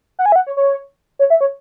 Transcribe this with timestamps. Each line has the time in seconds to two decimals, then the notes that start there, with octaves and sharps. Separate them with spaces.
0.19 F#5
0.26 G#5
0.32 E5
0.36 F#5
0.47 C#5
0.57 C#5
1.19 C#5
1.30 E5
1.41 C#5